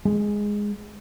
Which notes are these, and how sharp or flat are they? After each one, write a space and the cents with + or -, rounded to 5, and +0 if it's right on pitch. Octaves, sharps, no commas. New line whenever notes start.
G#3 -5